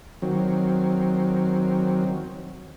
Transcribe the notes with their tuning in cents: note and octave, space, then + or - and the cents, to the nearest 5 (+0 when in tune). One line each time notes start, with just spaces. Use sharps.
D#3 +0 F#3 +0 C4 +0